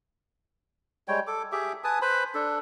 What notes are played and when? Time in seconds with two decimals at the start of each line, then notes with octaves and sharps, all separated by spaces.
1.08 G3 G#3 C#5 G5
1.27 A4 D6
1.52 G4 G#4 E5 D6
1.84 B4 G#5 A5 D#6
2.02 B4 C5 B5
2.34 D4 A4